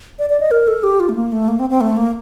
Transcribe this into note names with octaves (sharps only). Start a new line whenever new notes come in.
D5
D5
D#5
A#4
A4
G4
F4
A3
A#3
A3
A#3
C4
C4
A3
A#3